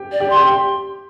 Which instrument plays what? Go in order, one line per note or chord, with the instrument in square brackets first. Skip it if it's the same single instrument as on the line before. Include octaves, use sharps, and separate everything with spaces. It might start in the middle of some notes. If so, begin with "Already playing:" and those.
Already playing: [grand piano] G4
[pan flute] D5
[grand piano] G4
[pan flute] C6
[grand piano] G4